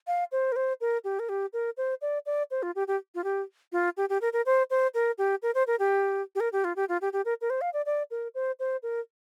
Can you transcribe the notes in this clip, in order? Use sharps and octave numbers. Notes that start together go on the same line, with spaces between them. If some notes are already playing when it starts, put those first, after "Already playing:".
F5
C5
A#4
C5
A#4
G4
A#4
G4
A#4
C5
D5
D5
C5
F4
G4
G4
F4
G4
F4
G4
G4
A#4
A#4
C5
C5
A#4
G4
A#4
C5
A#4
G4
G4
A#4
G4
F4
G4
F4
G4
G4
A#4
A#4
C5
F5
D5
D5
A#4
C5
C5
A#4